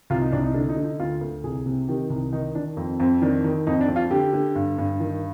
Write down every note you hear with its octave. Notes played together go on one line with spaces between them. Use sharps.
C2 F4
D#4
C2 D4
D#4
D3 D4
D#4
D3
D#4
D2 F4
D2
C2 G#4
C3
D#3 G4
C2
D#3 D#4
D#3 D4
F2 C4
F2 C4
D#3 D4
D#3
F2 D#4
D4
F2
F4
D3 G4
D3
G2
G2
D#3